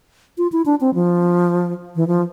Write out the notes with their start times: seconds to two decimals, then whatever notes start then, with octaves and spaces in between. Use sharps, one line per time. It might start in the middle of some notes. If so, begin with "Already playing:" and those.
0.38 F4
0.52 E4
0.66 D4
0.81 C4
0.94 F3
1.96 E3
2.07 F3